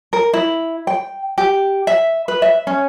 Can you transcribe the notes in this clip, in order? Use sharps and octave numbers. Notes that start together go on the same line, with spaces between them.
A#4
E4
G5
G4
E5
B4
E5
C#4